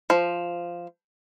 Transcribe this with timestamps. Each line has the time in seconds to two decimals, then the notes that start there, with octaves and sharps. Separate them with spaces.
0.10 F3